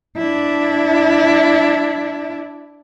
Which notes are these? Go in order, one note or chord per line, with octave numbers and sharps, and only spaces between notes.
D4 E4